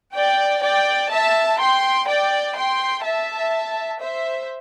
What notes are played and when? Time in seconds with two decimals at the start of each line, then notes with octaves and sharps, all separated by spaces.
0.14 D5 G5
0.62 D5 G5
1.10 E5 A5
1.59 G5 C6
2.07 D5 G5
2.55 G5 C6
3.04 E5 A5
4.00 C5 E5